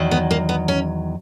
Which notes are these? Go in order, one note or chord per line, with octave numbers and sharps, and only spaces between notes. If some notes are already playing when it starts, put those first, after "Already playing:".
Already playing: E2 D#3 F#3
B3
A#3
B3
C#4